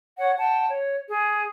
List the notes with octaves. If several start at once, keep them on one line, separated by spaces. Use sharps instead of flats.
C#5 F#5
F#5 G5 A5
C#5
G#4